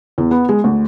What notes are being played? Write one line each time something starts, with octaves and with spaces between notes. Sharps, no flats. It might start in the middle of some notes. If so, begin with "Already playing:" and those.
E2
B3
G#3
D2